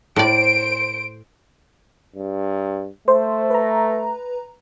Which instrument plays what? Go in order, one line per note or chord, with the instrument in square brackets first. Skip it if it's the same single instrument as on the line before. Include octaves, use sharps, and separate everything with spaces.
[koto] A2 D5 [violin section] C5 D7
[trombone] G2
[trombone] A3 [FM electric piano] C5
[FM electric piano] B4 A#5